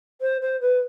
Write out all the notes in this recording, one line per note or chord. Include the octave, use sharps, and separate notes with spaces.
C5
C5
B4